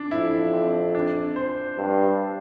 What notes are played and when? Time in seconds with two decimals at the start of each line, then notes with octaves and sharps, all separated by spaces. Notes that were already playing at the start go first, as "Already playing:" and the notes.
Already playing: D4
0.11 F2 E4
0.53 C4
0.95 D4
1.36 C5
1.78 G2